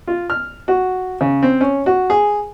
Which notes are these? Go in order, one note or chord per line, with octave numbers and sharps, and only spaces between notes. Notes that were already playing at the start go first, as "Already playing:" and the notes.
F4
F6
F#4
C#3
C4
C#4
F#4
G#4